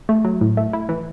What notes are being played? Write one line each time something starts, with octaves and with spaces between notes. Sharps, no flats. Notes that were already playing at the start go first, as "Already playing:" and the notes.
A3
F#3
A2
A3
E4
E3